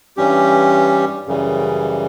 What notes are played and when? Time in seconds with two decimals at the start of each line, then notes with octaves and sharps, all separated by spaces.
0.17 G2 E3 G3 C#4 G4
1.27 F#2 C#3 E3 G3